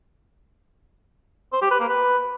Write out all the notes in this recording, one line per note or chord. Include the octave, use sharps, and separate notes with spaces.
C5
G4
B4
A#3
B4